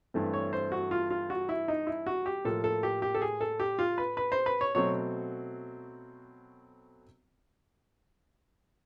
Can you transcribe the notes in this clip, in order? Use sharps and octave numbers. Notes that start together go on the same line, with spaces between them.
G2 E3 A3 C4
C#5
C5
F#4
F4
F4
F#4
E4
D#4
E4
F#4
G4
A2 F3 A#3 A4
A4
G4
G4
A4
G#4
A4
G4
F4
B4
B4
C5
B4
C#5
B2 F#3 A3 C4 C#5